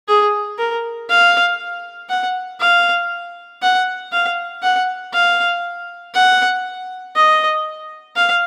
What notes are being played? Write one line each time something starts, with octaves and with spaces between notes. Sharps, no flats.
G#4
A#4
F5
F#5
F5
F#5
F5
F#5
F5
F#5
D#5
F5